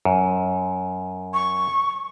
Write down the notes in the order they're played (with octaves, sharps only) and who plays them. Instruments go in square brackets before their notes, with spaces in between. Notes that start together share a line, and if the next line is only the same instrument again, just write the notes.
[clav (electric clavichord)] F#2
[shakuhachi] C#6